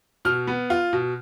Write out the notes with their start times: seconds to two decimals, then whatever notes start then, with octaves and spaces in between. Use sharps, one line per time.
0.25 B2 F6
0.47 B3
0.70 F4
0.93 B2